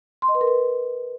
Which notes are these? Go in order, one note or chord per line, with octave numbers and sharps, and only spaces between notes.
C6
D#5
B4
A#4
B4